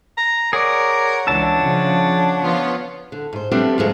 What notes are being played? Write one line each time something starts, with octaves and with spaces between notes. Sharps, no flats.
A#5
G#4 A#4 C#5 D5 F#5
C#2 E3 D4 E5 A5
C#3 F3
F3 B3 F4
D3
G#2 C5
F3 G3 A3 B3 C4 D4
D2 G#2 F3 G#3 C#4